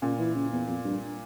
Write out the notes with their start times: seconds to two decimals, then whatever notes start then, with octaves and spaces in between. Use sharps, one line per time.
0.02 A#2 C#3
0.19 E3
0.35 C#3
0.52 E2
0.68 F2
0.85 G2